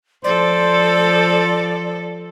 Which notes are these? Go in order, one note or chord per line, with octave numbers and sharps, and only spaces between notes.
F3 A4 C5 D5